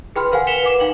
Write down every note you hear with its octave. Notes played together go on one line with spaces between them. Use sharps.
G#4 B4 G5 B5 C6 F6
A#4 C5 F5 F#5 G#5
B4 B6 C#7 E7 F7 G7
B4 F#5 D6 E7
D#4 F5 G5 F#7